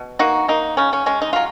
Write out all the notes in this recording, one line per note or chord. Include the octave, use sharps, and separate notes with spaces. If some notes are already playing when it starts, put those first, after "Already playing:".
Already playing: B2
A#3 D#4 F#4
A#3 D#4
C#3 C#4
C#4
G#3 C#4
D#4
F#3 F4